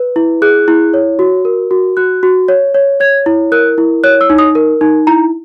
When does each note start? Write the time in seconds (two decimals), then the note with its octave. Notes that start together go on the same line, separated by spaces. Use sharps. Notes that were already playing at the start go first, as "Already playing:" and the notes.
Already playing: B4
0.16 E4
0.42 G#4 F#6
0.68 E4
0.94 C#5
1.19 F#4
1.45 A#4
1.71 F#4
1.97 F#4 F#6
2.23 F#4
2.48 C#5
2.74 C#5
3.00 C#5 G#6
3.26 E4
3.52 A#4 F#6
3.78 E4
4.04 C#5 F#6
4.21 E6
4.30 D#4
4.38 D#6
4.55 A#4
4.81 D#4
5.07 E4 A#5